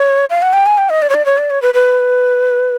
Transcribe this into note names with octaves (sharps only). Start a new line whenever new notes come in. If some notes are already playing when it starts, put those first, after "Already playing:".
Already playing: C#5
F5
F#5
G5
G#5
G5
D#5
D5
C#5
D5
C#5
D5
C#5
B4
B4